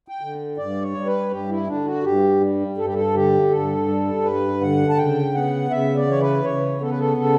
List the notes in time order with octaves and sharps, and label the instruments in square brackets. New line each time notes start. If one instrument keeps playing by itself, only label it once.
[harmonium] G5
D3
G2 D5
C#5
G3
B4
G2 G4
E4
D3 D4
F#4
G2 G4
G3
G2 A4
G4
A4
D3 G4
G2 A4
G3
G2 B4
D3 F#5
A5
C#3 G5
B3 F#5
C#3 E5
D5
E3 C#5
B4
C#3 C#5
B3 A4
B4
A4
C#3 A4